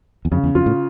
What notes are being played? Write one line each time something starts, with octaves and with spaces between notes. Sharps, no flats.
E2
F2 C#3
E2
F2 F4
A2